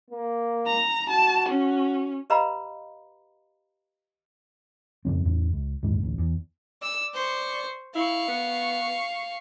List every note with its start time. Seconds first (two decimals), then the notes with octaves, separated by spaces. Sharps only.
0.10 A#3
0.66 A#5
1.10 F#4 A5
1.49 C#4
2.30 G4 B4 D#5 F5 A#5 B5
5.05 F2 C#3 F3 C4
5.25 E2 A2
5.53 C#2
5.83 F#1 D#2 G#2 D3
6.00 A1 D2
6.18 E2
6.82 D5 E6
7.14 C5 C#6
7.95 E4 F5 C#6
8.28 B3